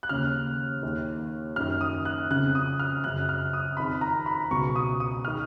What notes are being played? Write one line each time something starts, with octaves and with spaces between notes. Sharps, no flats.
F#6
D#2 C#3 F6
D#2 D#3
F#2 D#3 F6
D#6
F#6
F2 C#3 F#6
D#6
F6
F#2 C#3 F#6
F6
D#6
F2 D#3 B5
A#5
B5
C#2 B2 C#6
C#6
D#6
D#6
D#3 F6